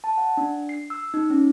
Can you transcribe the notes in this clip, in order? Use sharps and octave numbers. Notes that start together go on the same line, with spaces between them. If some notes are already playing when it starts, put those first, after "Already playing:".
A5
F#5
D4
C7
E6
D#4
C#4